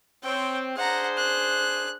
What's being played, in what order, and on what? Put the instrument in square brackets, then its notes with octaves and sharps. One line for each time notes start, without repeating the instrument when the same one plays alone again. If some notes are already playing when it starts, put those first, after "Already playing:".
[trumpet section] C4 [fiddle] C#5 G5
[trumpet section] D4 G#4 C5 [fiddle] F#5 A#5
[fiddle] F#6